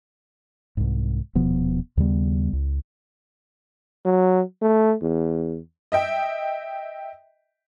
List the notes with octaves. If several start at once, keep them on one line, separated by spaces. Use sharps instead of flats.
C2 G#2
D#1 B2 F3 B3
D#2 C#3 G3 B3
C#2
F#3
A3
E2
D#5 E5 G5